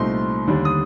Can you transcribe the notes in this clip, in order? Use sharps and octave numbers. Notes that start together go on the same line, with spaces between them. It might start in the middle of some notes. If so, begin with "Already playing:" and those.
Already playing: C2 A#2 A3 C4 D#4 C6
D#2 D3 G3 D4
D#6